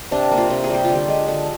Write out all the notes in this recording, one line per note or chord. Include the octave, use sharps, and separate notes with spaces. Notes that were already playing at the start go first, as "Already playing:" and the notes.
C3 D4
A#3
F4
C3
G#4
G3 G4
F4
D3
G4
G#3
D3